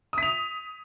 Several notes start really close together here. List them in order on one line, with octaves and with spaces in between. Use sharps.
D#6 B6 F7